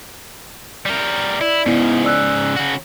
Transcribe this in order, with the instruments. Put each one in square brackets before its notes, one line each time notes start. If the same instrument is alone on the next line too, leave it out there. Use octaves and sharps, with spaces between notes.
[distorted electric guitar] G3 A#4
[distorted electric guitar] E4 [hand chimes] D5
[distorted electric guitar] G#2 C#3 [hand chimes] B3 E4
[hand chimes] D5 E6 F#6
[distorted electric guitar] C#3 F#4